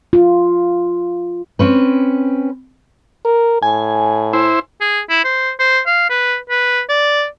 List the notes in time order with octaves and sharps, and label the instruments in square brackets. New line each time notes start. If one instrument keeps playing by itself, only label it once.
[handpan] F4
[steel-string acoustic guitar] C4 C#4 B4
[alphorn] A#4
[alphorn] A2 [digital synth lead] G#5
[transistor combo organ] E4 C5
[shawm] G#4
E4
C5
C5
F5
B4
B4
D5